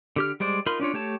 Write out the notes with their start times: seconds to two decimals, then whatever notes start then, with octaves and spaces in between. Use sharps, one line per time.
0.16 D3 G4 F6
0.40 G3 G#3 C5 D5
0.66 D#4 F4 A#4 B5 C6
0.80 C#4 D4 F4 C#5
0.94 A3 G4 C#5 A5